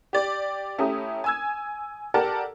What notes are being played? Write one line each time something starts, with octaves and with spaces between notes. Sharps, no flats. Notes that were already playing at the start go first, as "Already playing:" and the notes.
G4 D5
A3 C#4 E4 G4 A#5 D#6
G#5 E6 G#6
G4 A4 A#4 D5 F#5 A5